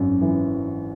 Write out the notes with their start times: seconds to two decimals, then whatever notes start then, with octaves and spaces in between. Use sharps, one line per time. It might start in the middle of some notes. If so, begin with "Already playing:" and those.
Already playing: G#1 F#2
0.21 E3